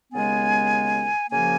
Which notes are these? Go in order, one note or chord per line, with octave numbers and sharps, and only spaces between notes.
D#2 C#3 G#3 B3 G#5
F#2 C#3 F3 A#3 G#5